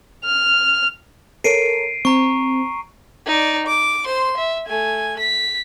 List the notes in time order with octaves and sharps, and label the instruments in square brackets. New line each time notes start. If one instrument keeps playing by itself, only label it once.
[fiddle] F6
[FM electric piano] A4 A#4 C#5 [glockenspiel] C7 D7 D#7
[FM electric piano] C4 [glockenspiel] A#5 C#6
[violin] D#4 D5
D6
C5 C6
E5
A3 G#5
B6